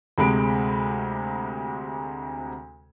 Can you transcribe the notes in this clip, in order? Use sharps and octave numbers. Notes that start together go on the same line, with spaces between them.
D2 C3 G#3 B5 D7